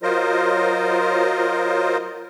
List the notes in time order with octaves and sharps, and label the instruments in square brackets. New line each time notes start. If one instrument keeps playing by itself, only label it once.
[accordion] F#3 F4 A#4 C5 D#5